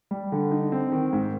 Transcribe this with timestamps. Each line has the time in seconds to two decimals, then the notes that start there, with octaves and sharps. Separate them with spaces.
0.11 G3
0.32 D3
0.52 D#4
0.72 C4
0.92 D#3
1.13 G#2